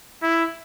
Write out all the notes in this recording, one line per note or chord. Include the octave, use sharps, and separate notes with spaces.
E4